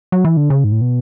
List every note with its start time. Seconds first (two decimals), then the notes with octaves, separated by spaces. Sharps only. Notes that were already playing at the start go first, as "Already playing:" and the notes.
0.12 F#3
0.25 E3
0.37 D3
0.50 C#3
0.64 G#2
0.72 A2
0.81 B2